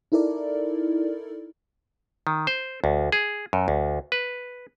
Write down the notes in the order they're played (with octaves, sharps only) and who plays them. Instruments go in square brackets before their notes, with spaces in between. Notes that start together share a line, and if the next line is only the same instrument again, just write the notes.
[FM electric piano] D#4 E4 A4 A#4 D5
[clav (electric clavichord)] D#3
C5
D2
G#4
F#2
D2
B4